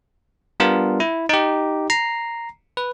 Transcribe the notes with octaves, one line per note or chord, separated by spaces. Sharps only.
G3 B3 D4 F4 A#4
E4
D#4 G4
A#5 C7
B4